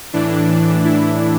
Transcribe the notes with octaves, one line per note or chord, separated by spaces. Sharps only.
A2 E3 D4
E4